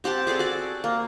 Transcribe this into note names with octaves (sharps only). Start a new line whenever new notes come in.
C4 G4 F#5 A5
G#4 A4 D5 G#5
F#4 D5
A#3